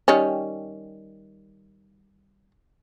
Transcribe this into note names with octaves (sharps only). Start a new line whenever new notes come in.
D#3 G3 C#4